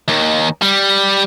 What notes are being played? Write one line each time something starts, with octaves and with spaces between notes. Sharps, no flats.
D#2 D#3
G3